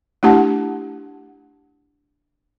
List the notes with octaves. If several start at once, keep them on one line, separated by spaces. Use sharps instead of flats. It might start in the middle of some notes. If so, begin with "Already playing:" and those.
A3 D4 E4 G4 F#5 A5